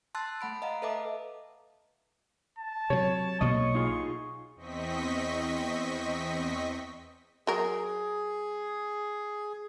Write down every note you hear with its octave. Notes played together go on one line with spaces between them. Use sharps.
A5 C6 E6 F#6 A6
A3 F#5 B5 D7
D#5 F5 F#5 A#5
A4 B4 D#5 E5 A5 D6
A5
C3 F#3 C#5
B1 B2 A#3 D#5 C#6
D#4 F4 G#4
E2 C4 D#5 C#6 B6
F#3 G#4 A#4